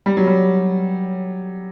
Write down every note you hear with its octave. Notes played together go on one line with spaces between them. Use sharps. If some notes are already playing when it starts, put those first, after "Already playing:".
G3
F#3
G3